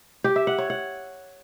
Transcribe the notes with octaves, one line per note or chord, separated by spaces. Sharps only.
G4
E5
F#5
C#5
F#5